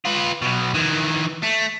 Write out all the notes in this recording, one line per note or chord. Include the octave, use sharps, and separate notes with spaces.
F4 B4
B1 B2
D#3 E3
A3